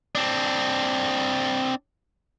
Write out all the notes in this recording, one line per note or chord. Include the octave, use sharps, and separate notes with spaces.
C4 D4